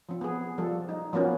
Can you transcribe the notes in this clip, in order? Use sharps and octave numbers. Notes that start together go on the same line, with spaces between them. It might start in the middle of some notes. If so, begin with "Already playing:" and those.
F3 C4
B3 G#4
F3 G3 A4
D#4
F3 F#3 A#3 B3 C#4